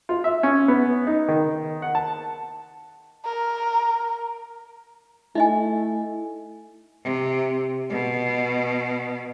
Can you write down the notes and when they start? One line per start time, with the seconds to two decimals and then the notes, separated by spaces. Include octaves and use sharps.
0.09 F4
0.24 E5
0.43 C#4
0.68 B3
1.07 D#4
1.28 D#3
1.82 F#5
1.95 A5
3.25 A#4
5.35 A3 D#4 E4 D#5 G#5
7.03 C3
7.90 B2